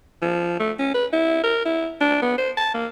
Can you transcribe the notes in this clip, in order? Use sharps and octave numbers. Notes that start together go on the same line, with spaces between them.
F3
A3
C#4
B4
E4
A#4
E4
D4
B3
C5
A5
A#3